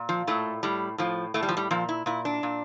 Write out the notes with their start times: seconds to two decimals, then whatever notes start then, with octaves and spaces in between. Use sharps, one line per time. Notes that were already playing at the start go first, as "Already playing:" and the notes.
Already playing: A#2
0.09 F3
0.27 A2 A3
0.63 A2 G3
0.98 A2 F3
1.34 A2 A3
1.43 G3
1.49 F3
1.57 G3
1.71 A#2 F3
1.89 E4
2.06 A#2 E4
2.25 D4
2.43 A#2